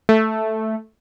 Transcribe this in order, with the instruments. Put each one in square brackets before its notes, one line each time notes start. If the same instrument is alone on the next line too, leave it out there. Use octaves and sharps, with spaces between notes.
[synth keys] A3